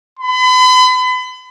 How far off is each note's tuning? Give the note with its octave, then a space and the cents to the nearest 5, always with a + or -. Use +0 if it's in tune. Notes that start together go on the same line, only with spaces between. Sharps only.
B5 +40